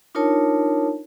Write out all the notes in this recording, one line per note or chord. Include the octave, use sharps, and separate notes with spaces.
D4 D#4 F4 A#4 C#5 A5